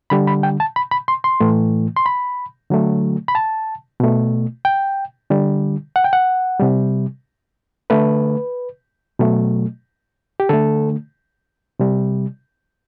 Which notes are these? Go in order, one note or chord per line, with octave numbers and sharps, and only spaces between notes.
D3 G3 B5
B5
G5
A5
B5
B5
C6
C6
A2 E3 A3
C6
B5
D3 F#3 A3
B5
A5
B2 A3
G5
D3 G3
F#5
G5
F#5
C3 G3
D3 A3 B4
B2 F#3 A3
G4
D3 A3 A4
C3 G3